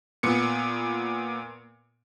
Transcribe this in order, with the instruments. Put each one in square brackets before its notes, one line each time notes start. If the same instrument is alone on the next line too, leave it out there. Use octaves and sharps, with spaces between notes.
[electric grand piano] A#2 B3 C#7